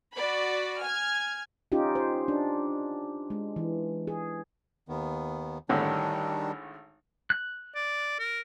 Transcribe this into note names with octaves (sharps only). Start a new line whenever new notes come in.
F#4 D5 B5
G#5 F6 G#6
C#4 D#4 F4 G4
C5
D4
G#3
E3
G#4
D#2 D#3 B3
G#1 A2 D3 D#3 G3 D4
F#6
D5
A#4